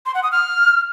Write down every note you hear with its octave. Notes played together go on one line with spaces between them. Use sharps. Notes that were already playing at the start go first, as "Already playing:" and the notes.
C6
F#5
D#6
F6